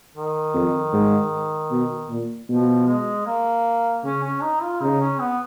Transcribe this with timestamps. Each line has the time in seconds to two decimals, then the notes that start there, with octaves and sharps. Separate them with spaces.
0.15 D#3
0.54 F2
0.93 G#2
1.71 B2
2.09 A#2
2.48 B2 F3
2.87 G#3
3.26 A#3
4.04 C#3 C#4
4.24 C#4
4.43 D#4
4.62 F4
4.82 C#3 D#4
5.01 C#4
5.21 B3